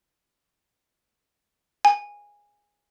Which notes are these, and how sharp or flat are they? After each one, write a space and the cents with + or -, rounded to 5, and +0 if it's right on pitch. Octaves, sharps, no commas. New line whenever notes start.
G#5 -15